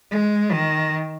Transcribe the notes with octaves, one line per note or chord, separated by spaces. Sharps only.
G#3
D#3